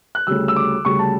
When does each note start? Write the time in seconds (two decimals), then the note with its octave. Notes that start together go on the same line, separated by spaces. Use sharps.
0.15 F#6
0.27 D2 C#3 G3 E6
0.48 E6
0.56 D6
0.85 D2 C#3 G3 C#6
0.99 A5